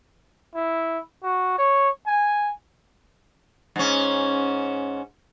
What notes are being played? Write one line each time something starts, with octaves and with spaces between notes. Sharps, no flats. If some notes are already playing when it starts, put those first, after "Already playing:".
E4
F#4
C#5
G#5
G#2 C#4